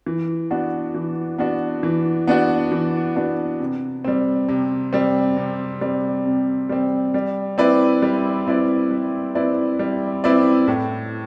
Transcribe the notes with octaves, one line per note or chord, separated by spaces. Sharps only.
E3
B3 D4 F#4
E3
B3 D4 F#4
E3
B3 D4 F#4
E3
B3 D4 F#4
C3
G3 C4
C3
G3 C4
C3
G3 C4
C3
G3 C4
G3
C4 E4 B4 D5
G3
C4 E4 B4 D5
G3
C4 E4 B4 D5
G3
C4 E4 B4 D5
A2